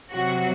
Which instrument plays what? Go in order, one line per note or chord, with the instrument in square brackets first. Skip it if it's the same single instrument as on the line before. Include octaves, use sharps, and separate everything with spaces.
[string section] C3 F#3 F#4